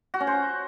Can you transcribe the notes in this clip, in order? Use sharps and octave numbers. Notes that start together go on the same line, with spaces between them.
F#4
C#4
C5